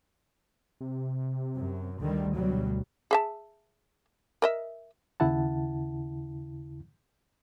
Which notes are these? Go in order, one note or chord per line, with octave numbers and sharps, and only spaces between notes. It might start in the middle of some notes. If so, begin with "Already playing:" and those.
C3
F#2
D2 D3 D#3 G3
B2 F#3 G3
G#4 E5 A5
A#4 D#5 E5
D#2 C#3 E4 F#5 A5